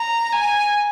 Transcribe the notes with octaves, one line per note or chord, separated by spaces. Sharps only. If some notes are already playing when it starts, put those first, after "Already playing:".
Already playing: A#5
G#5